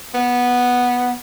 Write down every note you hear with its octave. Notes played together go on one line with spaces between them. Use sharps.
B3